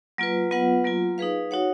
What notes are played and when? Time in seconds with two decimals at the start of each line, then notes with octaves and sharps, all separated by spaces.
0.18 F#3 A#3 F4 B4
0.51 F#3 B3 F4 B4 F#5
0.84 F#3 A#3 F4
1.18 D#4 G#4 B4 F5
1.51 D#4 F#4 C#5 F#5